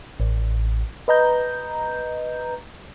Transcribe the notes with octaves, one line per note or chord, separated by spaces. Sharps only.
A1
B4 D#5 A#5 G6